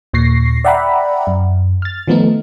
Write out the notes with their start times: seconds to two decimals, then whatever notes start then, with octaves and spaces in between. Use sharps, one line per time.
0.13 D#2 A#2 C#6 A#6 C7
0.65 D5 E5 F#5 G5 A#5 B5
1.27 F#2
1.82 F6 A6
2.08 D#3 F3 A3 B3 D#4